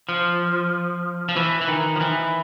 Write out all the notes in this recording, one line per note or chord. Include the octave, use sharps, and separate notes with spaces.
F3
F3
E3
E3
D#3
F3
E3